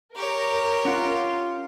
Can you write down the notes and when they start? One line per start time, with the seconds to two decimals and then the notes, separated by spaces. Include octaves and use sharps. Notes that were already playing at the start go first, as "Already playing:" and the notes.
0.16 G4 A#4 C#5
0.85 C#4 F4 F#5